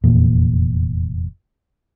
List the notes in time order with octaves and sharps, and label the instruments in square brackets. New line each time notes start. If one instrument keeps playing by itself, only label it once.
[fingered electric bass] F1 E2 A#2